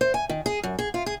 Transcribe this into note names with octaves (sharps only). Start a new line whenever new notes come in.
C5
G#5
D#3
G#4
F#2
G#4
F4
G#4